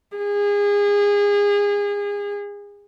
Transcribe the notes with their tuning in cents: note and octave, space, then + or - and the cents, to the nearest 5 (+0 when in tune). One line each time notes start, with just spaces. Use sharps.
G#4 -30